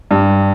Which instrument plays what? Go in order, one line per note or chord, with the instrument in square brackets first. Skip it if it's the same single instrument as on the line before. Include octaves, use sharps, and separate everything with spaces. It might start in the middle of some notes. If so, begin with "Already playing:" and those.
[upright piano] G2